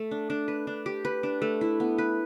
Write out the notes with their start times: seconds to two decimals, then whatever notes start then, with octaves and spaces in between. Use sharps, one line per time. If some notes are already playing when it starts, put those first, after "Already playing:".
Already playing: A3
0.11 D4
0.30 D4
0.48 B4
0.67 D4
0.86 G4
1.05 B4
1.23 D4
1.42 A3
1.61 E4
1.80 B3
1.98 B4